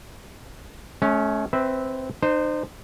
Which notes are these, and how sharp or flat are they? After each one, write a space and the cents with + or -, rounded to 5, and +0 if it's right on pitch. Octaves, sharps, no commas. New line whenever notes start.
A3 -40 C#4 +0
C4 +0 B4 +20 E5 -15
D#4 -40 C5 -10